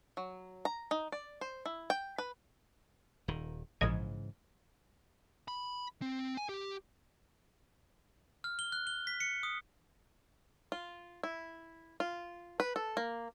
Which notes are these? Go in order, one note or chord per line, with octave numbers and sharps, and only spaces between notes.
F#3
A#5
D#4
D5
C5
E4
G5
B4
D#1 D#3
A#1 G#2 C#3 E3 D#5 G#6
B5
C4
G#5
G4
F6
G7
F#6
G7
B6
C#7
D#6
F4
E4
F4
B4
A4
A#3